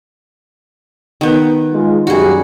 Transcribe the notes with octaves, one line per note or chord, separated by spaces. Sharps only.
D#3 B3
G#3 F4
F#2 G3 F#4 G#4